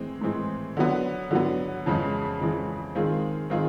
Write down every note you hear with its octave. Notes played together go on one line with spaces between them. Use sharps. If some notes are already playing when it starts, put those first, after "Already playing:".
Already playing: A2 E3 G#3 C4
A2 E3 G#3 C4
D3 F#3 B3
D3 F#3 B3
F2 C#3 E3 G#3
F2 C#3 E3 G#3
D#3 G#3 C4 F4 G#4
D#3 G#3 C4 F4 G#4